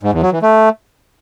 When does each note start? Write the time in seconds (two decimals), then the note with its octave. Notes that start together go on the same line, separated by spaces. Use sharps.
0.03 G#2
0.13 E2
0.23 F#3
0.32 E3
0.42 A3